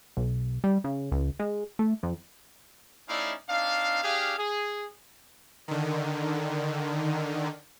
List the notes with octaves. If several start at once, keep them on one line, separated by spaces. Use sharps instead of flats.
B1
G3
C#3
C#2
G#3
A3
F2
A3 C#4 D#4 E4 D5 F5
C4 D4 D#4 F5
D4 G4 G#4 F5
G#4
D3 D#3